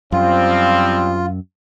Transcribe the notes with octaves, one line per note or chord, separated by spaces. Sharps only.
F#2 F3 G3 C4 F4 F5